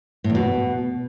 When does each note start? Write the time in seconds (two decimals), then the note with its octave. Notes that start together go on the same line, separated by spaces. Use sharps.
0.24 A2
0.30 E2
0.35 B2